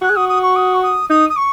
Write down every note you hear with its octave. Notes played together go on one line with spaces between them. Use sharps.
F#4 F#6
G#4
F#4 D#6
D#6
C#6
D#6
C#6
D#6
D#4 D#6
D#6
C#6